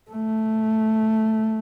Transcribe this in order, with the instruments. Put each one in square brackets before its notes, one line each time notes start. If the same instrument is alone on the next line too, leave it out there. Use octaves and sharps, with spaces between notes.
[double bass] A3